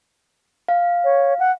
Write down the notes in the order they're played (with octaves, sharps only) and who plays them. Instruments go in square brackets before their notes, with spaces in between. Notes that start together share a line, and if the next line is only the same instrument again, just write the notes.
[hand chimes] F5
[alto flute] C#5
F#5